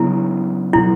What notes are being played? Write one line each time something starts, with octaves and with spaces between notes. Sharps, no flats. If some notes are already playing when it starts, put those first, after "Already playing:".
Already playing: C#3 F#3 B3 E4
B2 F#3 E4